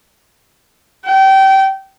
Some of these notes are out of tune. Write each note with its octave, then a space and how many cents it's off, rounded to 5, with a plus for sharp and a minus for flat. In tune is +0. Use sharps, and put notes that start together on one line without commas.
G5 -25